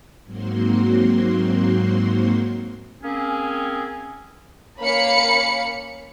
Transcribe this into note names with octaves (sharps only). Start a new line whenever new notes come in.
G#2 F#3 A#3 C4 F#4 C6
A#3 C4 C#4 G#4
A#3 C#4 F5 B5 C#7